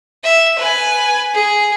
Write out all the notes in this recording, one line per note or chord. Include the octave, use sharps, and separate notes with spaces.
E5
B4 G#5
G#4